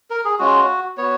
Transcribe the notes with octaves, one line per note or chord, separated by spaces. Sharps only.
A#4
G#4
G#3 C#4 F4 F#4
B3 F#4 C#5